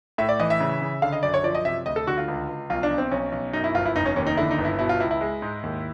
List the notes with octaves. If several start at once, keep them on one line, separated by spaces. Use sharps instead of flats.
A2 E5
D5
E3 D#5
E5
C#3
C#3
D3 F5
D#5
F#2 D5
C#5
F3 D5
D#5
C3 E5
D2 D#5
A4
D3 F#4
F4
C#2
C#2
B1 F4
D4
B1
C4
B1 C#4
B1
F#2 D#4
E4
G1 F4
E4
F1 D#4
C#4
D#2 C#4
D#4
D3 E4
D#4
G1
E4
B2 E4
F4
C#2 E4
E4
G#3
G#2
D#2